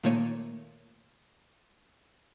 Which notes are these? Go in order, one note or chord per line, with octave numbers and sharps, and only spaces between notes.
A#2 D#3 A3 A#3 C#5 D#7